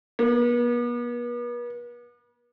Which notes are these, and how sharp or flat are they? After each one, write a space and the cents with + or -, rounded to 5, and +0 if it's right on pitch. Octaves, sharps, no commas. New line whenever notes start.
B3 -40